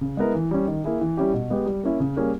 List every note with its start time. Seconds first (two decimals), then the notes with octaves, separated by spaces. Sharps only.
0.01 C#3
0.17 G#3 B3 E4 A#4
0.35 E3
0.51 G3 C#4
0.67 D#3
0.84 A#3 E4 G#4
1.01 E3
1.17 G3 C#4 E4 G4
1.33 B2
1.50 G#3 B3 G4
1.66 G3
1.83 A#3 C#4 E4
2.00 C#3
2.17 G3 A#3 C#4 G#4